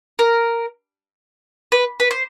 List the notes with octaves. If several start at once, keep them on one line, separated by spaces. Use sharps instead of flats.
A#4
B4
B4
C5